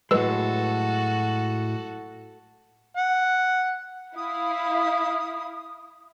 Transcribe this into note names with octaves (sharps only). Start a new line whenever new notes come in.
A2 F#3 G#3 F#4 A4 B4 E6
F#5
E4 F5 D#6